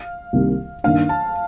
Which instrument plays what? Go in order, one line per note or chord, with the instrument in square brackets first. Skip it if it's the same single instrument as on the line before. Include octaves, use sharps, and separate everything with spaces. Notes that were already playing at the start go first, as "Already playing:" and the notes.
Already playing: [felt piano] F5
[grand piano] C2 C3 D#3 G3 A#3
[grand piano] G2 D#3 A#3 D4 [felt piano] F5
[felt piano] A5